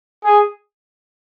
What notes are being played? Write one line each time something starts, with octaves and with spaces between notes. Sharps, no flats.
G#4